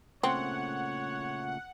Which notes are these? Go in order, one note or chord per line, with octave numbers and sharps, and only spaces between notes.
A#2 C#3 A3 C4 C#5 F#5